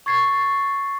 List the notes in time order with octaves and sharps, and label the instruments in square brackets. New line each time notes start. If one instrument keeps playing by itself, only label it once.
[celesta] C#6 G#6 A6 C7